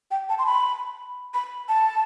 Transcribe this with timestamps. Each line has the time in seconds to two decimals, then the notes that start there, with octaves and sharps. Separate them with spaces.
0.11 G5
0.29 A5
0.39 C6
0.46 B5
1.34 B5
1.69 A5